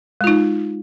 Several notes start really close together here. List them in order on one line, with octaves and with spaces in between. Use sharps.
G#3 F4 D#4